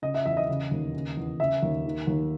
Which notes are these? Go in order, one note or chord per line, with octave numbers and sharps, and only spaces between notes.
C#3 D#5
E5
E2 E5
D#5
C#3
D#2
C#3
E2
C#3 E5
D#2
D#3
D#2